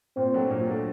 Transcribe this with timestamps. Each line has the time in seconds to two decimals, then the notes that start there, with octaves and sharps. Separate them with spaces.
0.16 A#2 C4
0.34 F#3 A3 D4
0.50 A#2
0.67 F#3 A3 D4